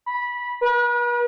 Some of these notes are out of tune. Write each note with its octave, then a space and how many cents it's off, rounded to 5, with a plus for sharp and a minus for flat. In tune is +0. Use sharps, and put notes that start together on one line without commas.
B5 -15
B4 -40